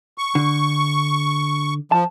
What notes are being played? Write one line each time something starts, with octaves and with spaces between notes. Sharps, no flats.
C#6
D3
F3 A5